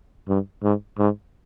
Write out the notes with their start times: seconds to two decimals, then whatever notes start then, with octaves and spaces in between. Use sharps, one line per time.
0.28 G2
0.63 G#2
0.98 G#2